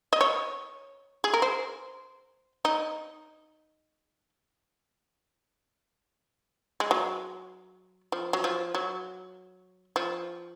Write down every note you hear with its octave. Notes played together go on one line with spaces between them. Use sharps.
D#5
C#5
G#4
A#4
C5
D#4
G#3
F#3
F3
F#3
F3
F#3
F3